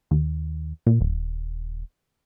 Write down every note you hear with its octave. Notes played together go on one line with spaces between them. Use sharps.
D#2
A#2
D#1